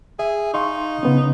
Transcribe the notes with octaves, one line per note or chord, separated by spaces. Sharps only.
G#4 E5
D#4 F5 C6 C#6
C#3 B3 C#4